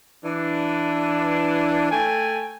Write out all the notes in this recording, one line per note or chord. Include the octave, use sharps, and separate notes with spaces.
E3 D4
A3 G5 G#5